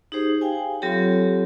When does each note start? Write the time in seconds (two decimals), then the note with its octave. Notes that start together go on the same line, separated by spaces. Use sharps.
0.12 D#4 G4 G#4 C5
0.41 F5 G5 G#5
0.82 F#3 C4 F4 G4 A4 C#5